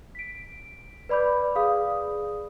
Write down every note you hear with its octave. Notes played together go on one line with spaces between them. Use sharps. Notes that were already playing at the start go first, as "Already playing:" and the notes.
B6 D7
B4 D5 B5 D6 G6
G#4 D5 F5 D#6